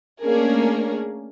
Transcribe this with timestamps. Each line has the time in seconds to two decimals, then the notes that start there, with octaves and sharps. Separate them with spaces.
0.23 A3 A#3 C#4 D4 G#4 A#4